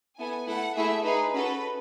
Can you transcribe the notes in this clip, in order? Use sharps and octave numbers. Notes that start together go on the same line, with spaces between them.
B3 E4 A4 G#5
A3 E4 A4 F#5
A3 E4 G#4 E5
D#4 G#4 B4
C#4 F#4 A4 B4